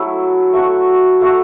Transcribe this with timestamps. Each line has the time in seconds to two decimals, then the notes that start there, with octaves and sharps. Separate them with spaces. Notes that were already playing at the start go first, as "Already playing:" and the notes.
Already playing: F#3 A3 E4
0.53 A3 F#4 A4
1.21 A3 F#4 A4